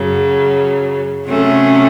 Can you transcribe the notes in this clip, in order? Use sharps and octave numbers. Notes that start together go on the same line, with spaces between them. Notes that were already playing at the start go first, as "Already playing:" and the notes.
Already playing: F#2 C#3 F#3
C3 F#3 A3 C#4